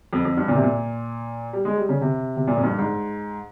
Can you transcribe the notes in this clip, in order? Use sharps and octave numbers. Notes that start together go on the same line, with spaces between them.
F2
F2
G2
A#2
C3
A#2
G3
G#3
G3
C#3
C3
C3
A#2
F2
G2
G#2